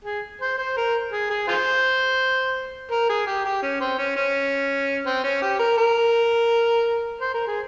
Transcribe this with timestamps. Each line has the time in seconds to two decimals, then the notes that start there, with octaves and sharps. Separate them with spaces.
0.04 G#4
0.41 C5
0.58 C5
0.77 A#4
1.12 G#4
1.30 G#4
1.48 F4 G#4 C5
2.91 A#4
3.09 G#4
3.27 G4
3.45 G4
3.63 C#4
3.80 C4
3.98 C#4
4.16 C#4
5.06 C4
5.24 C#4
5.42 G4
5.59 A#4
5.78 A#4
7.21 C5
7.34 A#4
7.47 G#4